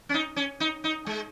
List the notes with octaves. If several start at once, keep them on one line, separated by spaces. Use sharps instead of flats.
C#4
D#4
C#4
D#4
D#4
G#3